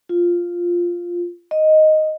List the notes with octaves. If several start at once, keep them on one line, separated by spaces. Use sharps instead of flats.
F4
D#5